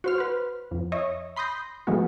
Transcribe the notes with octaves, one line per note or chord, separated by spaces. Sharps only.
F#4 C5 F6
B4 C5
F2
C#5 D#5 E5
B5 C6 D#6 G6 A#6
E3 F3 G#3 A3 B3 F#4